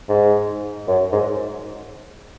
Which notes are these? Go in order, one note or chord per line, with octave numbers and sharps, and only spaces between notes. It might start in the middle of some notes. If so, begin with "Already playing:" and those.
G#2
F#2
G#2